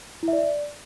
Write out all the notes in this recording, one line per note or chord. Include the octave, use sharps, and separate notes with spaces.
E4
E5
D5
E5
D5